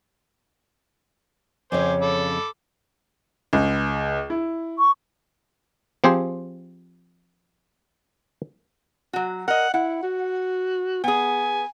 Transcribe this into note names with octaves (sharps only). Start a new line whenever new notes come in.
F2 C#3 C5 C#5 G#5 D6
A4 B5 D6
C#2
E4
C#6
F3 C4 G4 G#4 C5
F#3 F#4
A#4 D#5 F#5
E4 F#5
F#4
B3 G#4 G#5